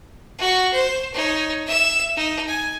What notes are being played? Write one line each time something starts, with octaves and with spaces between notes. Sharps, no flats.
F#4 C#6
C5
D#4 C#5
E5 E6
D#4
G#5